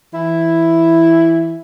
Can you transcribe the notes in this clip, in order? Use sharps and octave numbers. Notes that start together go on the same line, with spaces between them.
E3 E4